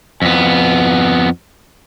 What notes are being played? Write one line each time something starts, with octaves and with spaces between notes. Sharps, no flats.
F2 B3